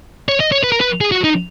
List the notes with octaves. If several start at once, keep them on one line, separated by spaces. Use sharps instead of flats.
C#5
D#5
C#5
B4
A#4
B4
G#4
F#4
D#4